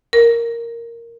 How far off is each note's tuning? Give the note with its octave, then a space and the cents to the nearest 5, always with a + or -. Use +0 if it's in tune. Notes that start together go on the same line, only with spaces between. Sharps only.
A#4 -5